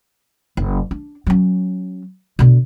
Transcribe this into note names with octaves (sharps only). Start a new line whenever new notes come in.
F#1
D4
F#3 C#4
B2 D3